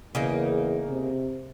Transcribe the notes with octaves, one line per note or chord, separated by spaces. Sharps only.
E2 C#3 A#3 D#4
C3